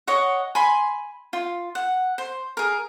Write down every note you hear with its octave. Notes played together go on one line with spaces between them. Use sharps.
C#5 D#5 F#5
G#5 B5 C6
F4
F#5
C5
G#4 A#4